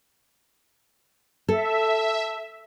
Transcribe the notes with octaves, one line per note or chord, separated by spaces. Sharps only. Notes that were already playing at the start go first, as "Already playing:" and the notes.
A4 E5